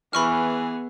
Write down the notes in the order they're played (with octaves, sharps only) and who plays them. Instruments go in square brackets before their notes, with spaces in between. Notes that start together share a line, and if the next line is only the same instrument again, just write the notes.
[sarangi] E3 [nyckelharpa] B3 G#4 [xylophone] B5 C#6 F6